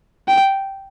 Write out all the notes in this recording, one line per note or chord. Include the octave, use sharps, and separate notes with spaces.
G5